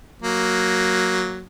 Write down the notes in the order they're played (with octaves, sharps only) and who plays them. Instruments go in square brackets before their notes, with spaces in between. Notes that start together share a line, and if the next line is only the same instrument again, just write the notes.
[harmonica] F#3 A#3